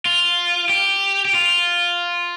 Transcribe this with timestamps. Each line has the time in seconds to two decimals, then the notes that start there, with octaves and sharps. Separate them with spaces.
0.05 F4
0.69 G4
1.25 G4
1.34 F4